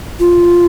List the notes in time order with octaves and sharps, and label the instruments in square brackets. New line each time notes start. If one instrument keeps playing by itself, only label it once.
[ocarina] F4